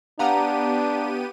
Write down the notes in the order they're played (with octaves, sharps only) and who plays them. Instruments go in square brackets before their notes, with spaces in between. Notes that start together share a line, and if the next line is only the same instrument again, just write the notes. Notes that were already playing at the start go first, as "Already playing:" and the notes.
[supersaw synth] B3 G4 D#7 [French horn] D4 [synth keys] F5 A#5 [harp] F#5